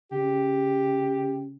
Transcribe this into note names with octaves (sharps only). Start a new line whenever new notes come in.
C#3 G4